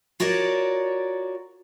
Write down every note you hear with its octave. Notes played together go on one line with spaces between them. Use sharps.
F4 F#4 A#4 C#5 D5